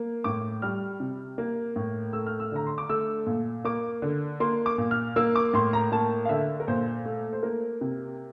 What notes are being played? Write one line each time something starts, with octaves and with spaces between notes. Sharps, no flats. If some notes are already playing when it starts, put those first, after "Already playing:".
Already playing: A#3
A2 D6
G3 F6
C3
A#3
A2
A3 E6
F6
E6
D3 A#5
C6
D6
A3 E6
A#2
A#3 D6
D3
A#3 C6
D6
A#2
F6
A#3 E6
D6
A2 C6
A#5
A#3 A5
F5
D3 E5
A#4
A#2 C5
A3
C5
A#3 A#4
C3